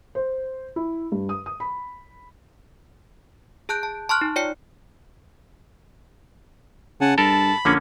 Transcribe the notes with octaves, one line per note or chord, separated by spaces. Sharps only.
C5
E4
G2
D#6
D#6
B5
G#4 A5 F#6 G6 D7
A5
A5 C6 C#6 F6 F#6
D#4
F4 C#5 D5 G5 C#7
C#3 F#5 G#5 A5
G2 A4 A#4 A5 B5
A#1 D3 A#3 C#4